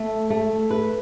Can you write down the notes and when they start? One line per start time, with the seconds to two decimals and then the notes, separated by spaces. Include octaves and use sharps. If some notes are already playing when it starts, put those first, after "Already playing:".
Already playing: A3
0.30 A3
0.70 B4